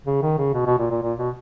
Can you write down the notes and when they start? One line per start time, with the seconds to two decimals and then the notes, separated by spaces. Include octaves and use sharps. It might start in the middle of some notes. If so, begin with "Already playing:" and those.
0.06 C#3
0.22 D#3
0.38 C#3
0.54 B2
0.66 B2
0.78 A#2
0.90 A#2
1.02 A#2
1.19 B2